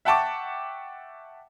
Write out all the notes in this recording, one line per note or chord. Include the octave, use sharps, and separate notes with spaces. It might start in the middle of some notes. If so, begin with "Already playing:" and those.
E5 F#5 G5 A5 C#6 D6